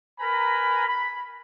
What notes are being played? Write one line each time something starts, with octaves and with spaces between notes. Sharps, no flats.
A#4 B4 G#5 A#5 B5
B5